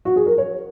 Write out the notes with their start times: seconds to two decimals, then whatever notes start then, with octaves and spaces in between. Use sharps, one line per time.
0.05 F#4
0.16 G#4
0.26 A#4
0.38 C#5